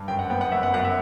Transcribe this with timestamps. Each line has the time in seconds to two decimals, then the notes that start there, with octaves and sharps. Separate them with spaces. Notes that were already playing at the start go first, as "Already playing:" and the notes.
Already playing: G2
0.08 F#2 G5
0.19 F#5
0.30 B3 G5
0.41 F#5
0.52 F#2 E5
0.63 F#5
0.74 F#2 F#5
0.85 E5